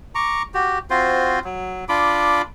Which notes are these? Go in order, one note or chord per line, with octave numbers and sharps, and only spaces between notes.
A#5 C#6 D6
F#4 G4
C4 F4 F#4 C5
F#3
D4 F4 B5 D6